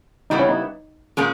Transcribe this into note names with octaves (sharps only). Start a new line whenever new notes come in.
C#3 G3 B3 D#4 E4
C#4
D#4
A#2 G#3 C#4 G#4